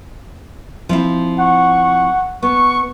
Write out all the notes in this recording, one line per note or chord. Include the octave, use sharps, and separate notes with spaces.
F3 C4 E4
F#5 C#6
B3 C#6